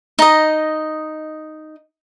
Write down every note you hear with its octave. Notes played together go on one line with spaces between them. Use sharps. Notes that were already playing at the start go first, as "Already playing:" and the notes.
D#4 D#5